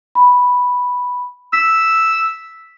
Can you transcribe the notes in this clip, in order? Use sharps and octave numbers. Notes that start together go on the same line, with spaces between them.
B5
E6 B6